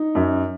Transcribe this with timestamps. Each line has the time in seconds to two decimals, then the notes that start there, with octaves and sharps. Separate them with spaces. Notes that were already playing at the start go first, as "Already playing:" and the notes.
Already playing: D#4
0.15 F#2